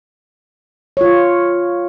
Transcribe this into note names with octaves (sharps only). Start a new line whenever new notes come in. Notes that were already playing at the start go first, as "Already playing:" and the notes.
F4 C#5